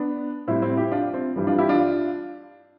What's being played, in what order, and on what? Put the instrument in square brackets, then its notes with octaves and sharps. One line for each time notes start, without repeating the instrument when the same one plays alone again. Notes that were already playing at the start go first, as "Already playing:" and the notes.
Already playing: [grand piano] B3 D4
A2 G3 C4 E4
C4 E4
E4 G4
D4 F4
C4
G2 E3 G3
D4 F4
E4 G4
D4 F4